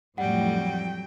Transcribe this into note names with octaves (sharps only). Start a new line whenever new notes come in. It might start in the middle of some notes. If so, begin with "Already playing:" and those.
F2 A2 F#3 G3 F#5 G5